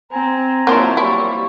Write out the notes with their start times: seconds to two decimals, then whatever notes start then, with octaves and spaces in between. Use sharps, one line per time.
0.11 C4 G#5 A#5
0.67 F3 F#3 A#3 E4 C5 D5
0.97 E2 G3 A#3 E4 C#6